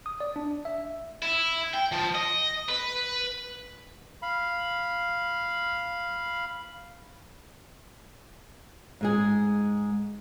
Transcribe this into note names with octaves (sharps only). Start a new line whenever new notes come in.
D#6
D5
D4
E5
E4
G5
F3
D#5
B4
F5 B5
G#2 G#3 G#4